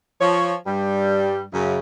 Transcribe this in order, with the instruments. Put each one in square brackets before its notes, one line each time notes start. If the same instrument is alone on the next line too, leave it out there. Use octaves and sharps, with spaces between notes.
[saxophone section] F3 C#5
G2 G3
F#2 C#3